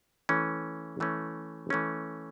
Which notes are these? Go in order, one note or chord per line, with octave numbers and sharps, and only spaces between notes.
E3 A3 C#4
E3 A3 C#4
E3 A3 C#4